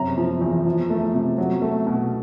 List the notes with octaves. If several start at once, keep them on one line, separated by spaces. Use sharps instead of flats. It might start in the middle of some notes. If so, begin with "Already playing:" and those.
Already playing: F#2 C3 A#5
F3
E2
F3
A3
C3
F#3
A3
B2